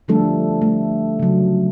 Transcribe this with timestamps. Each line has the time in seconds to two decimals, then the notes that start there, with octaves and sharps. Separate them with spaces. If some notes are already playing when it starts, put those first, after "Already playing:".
0.08 D3 F3 G3 A3 D4 A4
0.62 A3
1.19 C#3 F#3